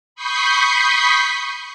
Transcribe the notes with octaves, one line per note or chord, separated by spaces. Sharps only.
B5 C#6 D#6 G6 B6 C7